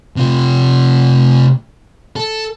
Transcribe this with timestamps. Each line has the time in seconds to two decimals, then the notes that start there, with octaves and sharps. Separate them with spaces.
0.16 C3 F4
2.16 A4